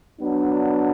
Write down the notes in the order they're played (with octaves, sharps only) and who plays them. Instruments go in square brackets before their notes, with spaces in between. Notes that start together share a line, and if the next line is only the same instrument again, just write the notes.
[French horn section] F#3 B3 D4